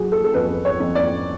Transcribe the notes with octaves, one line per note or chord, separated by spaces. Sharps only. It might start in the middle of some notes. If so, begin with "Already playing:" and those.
Already playing: F#3 F#4 G#4
A4
A4
F2 B4
C#5
F2
D5